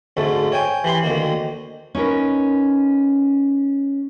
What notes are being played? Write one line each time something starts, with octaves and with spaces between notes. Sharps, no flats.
D2 G#2 A3
C#5 G5 G#5
E3 G4 B5 C6
D2 D#3 A#3
C#4 D#4 A#4 B4